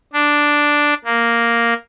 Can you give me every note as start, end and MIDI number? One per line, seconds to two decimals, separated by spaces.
0.13 0.94 62
1.05 1.74 58